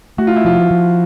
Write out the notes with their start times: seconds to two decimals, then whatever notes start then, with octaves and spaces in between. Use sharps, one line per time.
0.18 A3 F#4
0.27 F4
0.36 E4
0.45 F3 F4
0.71 F3